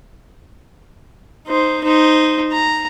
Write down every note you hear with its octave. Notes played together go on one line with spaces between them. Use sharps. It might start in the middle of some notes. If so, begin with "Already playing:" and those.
D#4 C5
D#4 C5
A#5